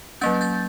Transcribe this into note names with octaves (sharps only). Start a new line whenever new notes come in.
F#3 A#3 C#4 G6 A6
G6 A6